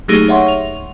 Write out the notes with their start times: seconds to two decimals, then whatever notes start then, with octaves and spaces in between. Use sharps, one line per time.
0.08 F#3 A3 A#3 D#4 G4 G#4
0.28 C#5 E5 F#5 C6 C#6
0.48 F7